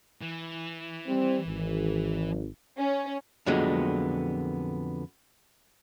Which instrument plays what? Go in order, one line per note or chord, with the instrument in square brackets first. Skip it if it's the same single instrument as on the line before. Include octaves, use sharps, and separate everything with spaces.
[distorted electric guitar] E3
[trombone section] G3 C4
G#1
[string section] C#4
[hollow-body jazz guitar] F2 A#2 D3 F#3 G#3 B3